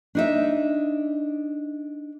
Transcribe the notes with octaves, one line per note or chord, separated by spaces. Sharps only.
D4 D#4 E5